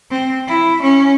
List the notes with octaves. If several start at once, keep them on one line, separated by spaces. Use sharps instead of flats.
C4
E4
C#4